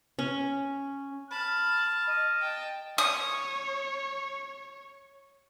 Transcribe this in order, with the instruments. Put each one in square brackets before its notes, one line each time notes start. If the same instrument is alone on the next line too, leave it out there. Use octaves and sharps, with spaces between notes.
[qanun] C#4
[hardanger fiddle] A5 [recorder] B5 [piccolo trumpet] F6
[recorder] D#5
[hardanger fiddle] G5 A5
[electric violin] C#5 [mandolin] D#6